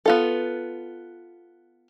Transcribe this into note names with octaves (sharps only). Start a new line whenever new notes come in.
B3 F4 A4